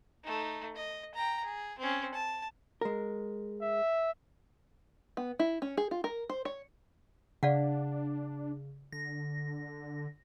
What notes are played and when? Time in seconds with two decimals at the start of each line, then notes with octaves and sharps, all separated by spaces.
0.24 A3 D#4
0.76 D#5
1.14 G5 A#5
1.44 G#4
1.79 C4 C#4
2.14 A5
2.81 G#3 A#4
3.62 E5
5.17 B3
5.39 E4
5.62 C#4
5.77 G#4
5.91 F4
6.04 A#4
6.29 C5
6.45 C#5
7.43 C#3 D4 D5 F5 F#5
8.93 D3 A#6